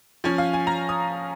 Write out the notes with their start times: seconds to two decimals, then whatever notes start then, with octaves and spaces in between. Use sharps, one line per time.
0.24 F3 C#4 G#5
0.38 F5
0.53 G#5
0.67 A#5
0.89 D#6